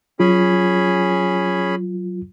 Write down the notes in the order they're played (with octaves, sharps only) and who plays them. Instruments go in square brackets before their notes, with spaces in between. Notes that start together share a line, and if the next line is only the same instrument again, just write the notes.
[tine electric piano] F#3 F4 [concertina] C#4 G#4 B5